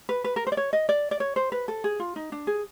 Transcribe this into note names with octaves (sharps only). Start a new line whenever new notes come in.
B4
B4
A#4
C5
D5
C#5
D#5
D5
D5
C#5
C5
B4
A4
G#4
F4
D#4
D4
G#4